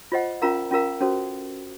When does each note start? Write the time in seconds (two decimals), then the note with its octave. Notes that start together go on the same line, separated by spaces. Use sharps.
0.12 F4 C5 D#5 F#5
0.42 C#4 F4 A#4 F5 A#5
0.71 C#4 F4 A#4 F5 A#5
1.01 C#4 F#4 A4 C5